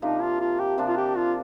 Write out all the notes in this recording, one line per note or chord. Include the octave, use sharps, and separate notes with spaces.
C3 F3 A#3 D4 D#4
F4
F4
G4
C3 F3 A#3 D4
F4
G4
F4